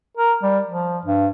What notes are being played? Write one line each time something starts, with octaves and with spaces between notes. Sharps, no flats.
A#4
G3
F3
G2